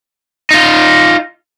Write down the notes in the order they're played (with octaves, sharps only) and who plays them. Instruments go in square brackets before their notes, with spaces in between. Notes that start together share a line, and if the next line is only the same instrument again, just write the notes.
[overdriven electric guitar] D#4 F4